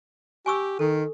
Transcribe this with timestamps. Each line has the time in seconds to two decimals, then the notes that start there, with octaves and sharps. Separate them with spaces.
0.46 G4 G#5 C#6 E6
0.79 D#3 A4